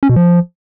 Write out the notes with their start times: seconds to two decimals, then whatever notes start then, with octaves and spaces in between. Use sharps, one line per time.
0.03 C#4
0.09 B2
0.16 F3